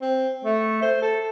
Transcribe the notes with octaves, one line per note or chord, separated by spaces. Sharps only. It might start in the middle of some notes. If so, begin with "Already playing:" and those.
C4
A3
C5
A4